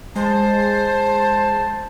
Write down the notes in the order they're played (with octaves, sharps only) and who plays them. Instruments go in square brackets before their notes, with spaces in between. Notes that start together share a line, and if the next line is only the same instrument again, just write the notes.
[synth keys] G#3 [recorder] C5 [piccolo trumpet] A5